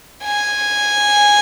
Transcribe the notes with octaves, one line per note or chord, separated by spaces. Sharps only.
G#5